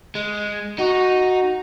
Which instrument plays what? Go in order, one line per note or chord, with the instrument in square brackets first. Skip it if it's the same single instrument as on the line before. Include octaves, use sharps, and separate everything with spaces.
[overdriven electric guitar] G#3
[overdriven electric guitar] D#4 [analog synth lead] F#4